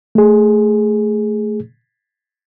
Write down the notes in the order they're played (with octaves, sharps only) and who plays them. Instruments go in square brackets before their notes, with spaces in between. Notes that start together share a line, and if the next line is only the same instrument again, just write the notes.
[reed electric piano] A3 G#4